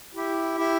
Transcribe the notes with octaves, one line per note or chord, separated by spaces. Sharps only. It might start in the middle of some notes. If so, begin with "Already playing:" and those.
E4 G4
E4 G4